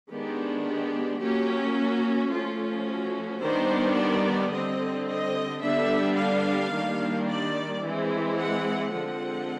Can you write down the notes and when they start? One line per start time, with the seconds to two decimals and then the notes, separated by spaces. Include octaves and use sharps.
0.10 D#3 G#3 B3 D4 G4
0.65 G4
1.20 F#3 A#3 C#4 G4
1.76 F#4
2.31 F3 A3 C#4 F4
2.85 F#4
3.41 D#3 G3 B3 D4 C5
3.96 D5
4.51 D3 G3 C4 D#5
5.07 D#5
5.61 D3 G3 B3 D4 E5
6.16 F5
6.72 D#3 G3 A#3 D4
7.27 D5
7.82 E3 G#3 C4
8.37 F#5
8.92 D3 F3 G#3 C4 F#5